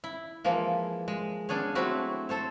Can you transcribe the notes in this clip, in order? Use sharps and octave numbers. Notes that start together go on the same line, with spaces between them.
E4
E3 F3 G#3 A#3
G#3
B3 C#4 D4 G#4 C#5
F#3 A3 C4 E4 F#4
A4 C5 C#5